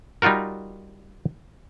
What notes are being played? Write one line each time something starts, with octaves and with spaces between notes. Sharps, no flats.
G3 D#4 F4 F#4 A#4